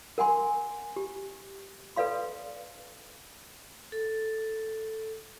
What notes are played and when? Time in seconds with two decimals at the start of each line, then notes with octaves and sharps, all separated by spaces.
0.18 A#4 F#5 G#5 C6
0.96 G4
1.96 A4 B4 D5 F5 C6
3.92 A4